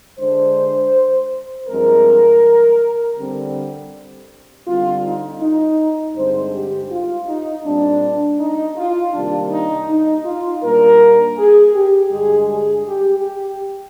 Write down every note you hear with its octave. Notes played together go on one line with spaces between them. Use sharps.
D3 G#3 D4 C5
G2 F3 G#3 C4 A#4
D3 G3 C4
D3 G3 C4 F4
D#4
D#4
G2 D3 G#3 C4 C5
G4
F4
D#4
A#2 G3 C4 D4
D#4
F4
C3 D#3 G3 A#3 D4
D#4
D#4
F4
A#2 G3 A#3 D4 A#4
G#4
G4
G2 D3 G#3 G#4
G#4
G4
G4